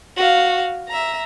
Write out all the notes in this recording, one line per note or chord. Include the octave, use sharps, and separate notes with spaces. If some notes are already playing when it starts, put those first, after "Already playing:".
F#4 F5
E5 A#5